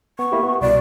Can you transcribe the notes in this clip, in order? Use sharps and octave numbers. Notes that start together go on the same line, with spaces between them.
B3 C#6
A#3 E4 G4
B3
C2 B2 D5